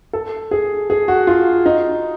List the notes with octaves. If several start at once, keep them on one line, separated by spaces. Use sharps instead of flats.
A4
G#4
G#4
F#4
F4
D#4